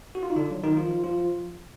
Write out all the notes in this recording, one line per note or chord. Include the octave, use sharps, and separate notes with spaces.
F#4
F4
D#4
D3 D4
F#3
D#3 D#4
F3 F4
F3 F4